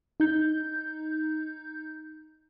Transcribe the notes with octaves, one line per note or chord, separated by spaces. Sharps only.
D#4 G6